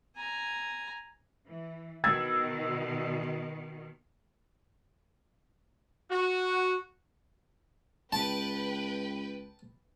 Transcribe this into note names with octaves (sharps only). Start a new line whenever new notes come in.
G#5 A#5
E3
B2 D#3 E6 G#6 A6
F#4
C#2 B4 G5 A5